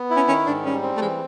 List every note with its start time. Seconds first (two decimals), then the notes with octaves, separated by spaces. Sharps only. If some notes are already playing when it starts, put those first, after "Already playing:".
Already playing: B3
0.10 E4
0.16 C#4
0.28 D#3 C#4
0.47 G#2 D4
0.65 G3 C#4
0.82 C4
0.97 A3
1.01 E3 G#3